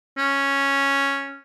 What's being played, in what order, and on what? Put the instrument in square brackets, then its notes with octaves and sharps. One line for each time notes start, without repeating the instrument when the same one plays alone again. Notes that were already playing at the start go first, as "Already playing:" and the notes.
[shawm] C#4